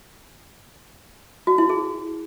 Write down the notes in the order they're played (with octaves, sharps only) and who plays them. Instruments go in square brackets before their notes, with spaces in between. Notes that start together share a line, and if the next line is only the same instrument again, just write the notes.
[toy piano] F#4
E4
G#4